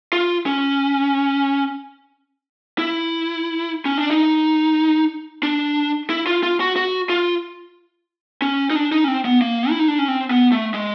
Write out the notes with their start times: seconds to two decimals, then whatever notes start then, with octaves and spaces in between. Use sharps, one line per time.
0.13 F4
0.46 C#4
2.78 E4
3.85 C#4
3.98 D4
4.11 D#4
5.43 D4
6.10 E4
6.27 F4
6.43 F4
6.60 F#4
6.76 F#4
7.10 F4
8.42 C#4
8.70 D#4
8.76 D4
8.92 D#4
9.04 C#4
9.08 C4
9.25 B3
9.42 A#3
9.70 E4
9.79 D#4
9.88 D4
9.99 C#4
10.08 C4
10.31 B3
10.52 A3
10.74 G#3